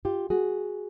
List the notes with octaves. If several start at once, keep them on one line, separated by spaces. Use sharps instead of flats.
F4 G4
F#4 G#4